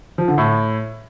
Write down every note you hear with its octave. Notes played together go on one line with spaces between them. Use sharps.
F3
D3
A2